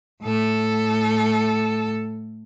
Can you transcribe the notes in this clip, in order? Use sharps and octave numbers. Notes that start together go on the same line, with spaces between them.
A2 A4